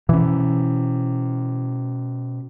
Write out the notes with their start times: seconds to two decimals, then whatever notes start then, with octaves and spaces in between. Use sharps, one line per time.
0.09 B2 E3 C#4